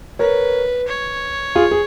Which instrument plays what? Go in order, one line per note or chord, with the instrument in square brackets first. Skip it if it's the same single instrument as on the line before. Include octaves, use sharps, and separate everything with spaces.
[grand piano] A#4 C#5 [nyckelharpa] B4
[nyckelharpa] C#5
[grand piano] F4 G#4
G#4